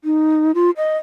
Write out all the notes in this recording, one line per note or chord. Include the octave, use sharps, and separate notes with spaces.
D#4
F4
D#5